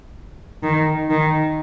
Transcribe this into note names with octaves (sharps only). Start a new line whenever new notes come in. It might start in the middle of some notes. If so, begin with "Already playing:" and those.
D#3
D#3